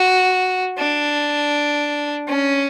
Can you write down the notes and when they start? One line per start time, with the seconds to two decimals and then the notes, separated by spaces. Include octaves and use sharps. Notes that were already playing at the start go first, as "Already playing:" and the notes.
Already playing: F#4
0.78 D4
2.28 C#4